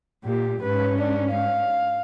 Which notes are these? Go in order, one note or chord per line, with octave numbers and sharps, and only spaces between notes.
A#2 G4
G#2 C#4 B4
D4
F5